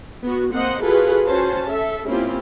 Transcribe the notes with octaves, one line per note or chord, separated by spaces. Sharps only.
B3 F#4
A#3 C4 C5 D#5 F#5
F4 F#4 G#4 A4 B4
C#4 F#4 C5 A5
A4 E5
A#3 C4 C#4 E4 F4 G4